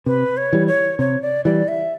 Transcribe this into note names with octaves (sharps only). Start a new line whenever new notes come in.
C3 B4
C#5
E3 G3
C#5
C3 C#5
D5
E3 G3 D5
E5